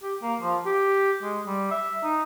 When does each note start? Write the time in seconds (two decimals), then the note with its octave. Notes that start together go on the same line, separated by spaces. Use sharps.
0.03 G4
0.23 A#3
0.42 F3
0.66 G4
1.23 G#3
1.47 G3
1.71 E5
2.03 D#4